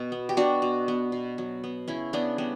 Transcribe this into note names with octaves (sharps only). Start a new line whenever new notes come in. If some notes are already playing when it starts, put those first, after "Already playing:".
Already playing: B2
B3
G4
B2 D4 F#4
B2
B3
B2
F#3
B3
C#3 C#4 E4
C#3 B3 D4
G3 B3